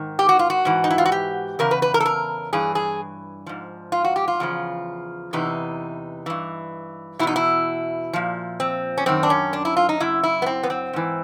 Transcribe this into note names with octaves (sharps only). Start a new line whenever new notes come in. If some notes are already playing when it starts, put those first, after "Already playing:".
Already playing: G#2 D#3
G4
F#4
F4
F#4
G#2 E3
D#4
E4
F4
F#4
G4
E2 C#3 A#4
B4
B4
A#4
A4
A#4
G2 E3 G#4
G#4
G#2 F3
F4
F#4
G4
F4
E2 C#3 F3
E2 C3 E3 D#4
G2 E3
E2 B2 D#4 E4
E4
A#2 F3
C4
C#4
F#2 D#3 C4
D4
C#4
D4
E4
F4
D#4
F#2 C#3 E4
E4
B3
C4
B3
C4
G#2 E3